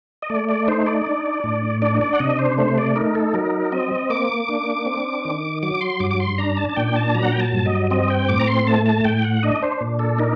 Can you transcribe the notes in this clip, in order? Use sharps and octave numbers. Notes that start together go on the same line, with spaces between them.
D#5
A3 D5
D5
D#4 C5
D5
D4
A2
D4 D5
D5
F#5
C3 D#5
C5
A3 C5
D5
D#4 A#4
A4
F#3 A#4
C4 D#5
A#3 D6
D4
C4
D#3
F#3 D6
C6
G2 D6
D6
C6
D4 A#5
A5
A5
A#2 G5
A5
F#3 A#5
F#5
G5
A5
G2
D#5
C4 D#5
G5
A2 D6
A#5
C6
A3 A5
A5
A2 G5
F#5
D4 D#5
C5
A#2
A4
D#4 A#4